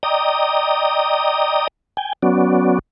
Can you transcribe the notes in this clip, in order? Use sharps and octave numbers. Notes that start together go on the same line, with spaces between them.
D5 D#5 G5 A#5 D#6
G5 G#5
F#3 B3 C#4 F#4 D5